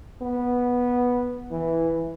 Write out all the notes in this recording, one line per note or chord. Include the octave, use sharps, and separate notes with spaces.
B3
E3